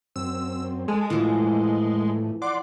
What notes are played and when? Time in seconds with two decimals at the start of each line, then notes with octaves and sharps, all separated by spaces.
0.16 F#2 C4 E6
0.88 G#3 G#4 A4
1.10 A2 E3 F3
2.42 D5 F#5 C6 D6